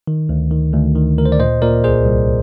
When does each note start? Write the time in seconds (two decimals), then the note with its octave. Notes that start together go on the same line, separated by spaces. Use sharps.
0.07 D#3
0.29 D2
0.51 D#3
0.73 D2
0.96 D#3
1.18 D2 A#4
1.26 C5
1.32 D5
1.39 A#2 C5 D#5
1.62 A#2 A#4 D5
1.84 C2 G#4 C5
2.06 C2